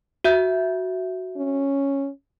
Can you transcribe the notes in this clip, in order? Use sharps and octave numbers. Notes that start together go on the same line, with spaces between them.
F#4 E5 G6
C#4